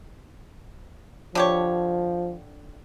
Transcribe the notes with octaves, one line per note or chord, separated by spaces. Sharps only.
D3 F3 G4 C#5